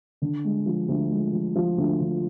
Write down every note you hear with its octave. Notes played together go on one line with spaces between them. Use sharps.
D3
G#3
F3
D2
G#3
F3
F3
D2
D3